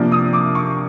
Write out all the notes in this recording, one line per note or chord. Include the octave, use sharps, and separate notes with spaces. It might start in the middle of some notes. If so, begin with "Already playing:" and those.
Already playing: C3 F3 A#3 D4
D#6
D6
C#6